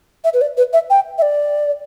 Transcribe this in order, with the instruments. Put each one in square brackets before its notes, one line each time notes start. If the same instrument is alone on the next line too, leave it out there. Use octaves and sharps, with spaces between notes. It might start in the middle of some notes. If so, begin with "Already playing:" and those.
[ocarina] E5
B4
D5
B4
E5
G5
E5
D5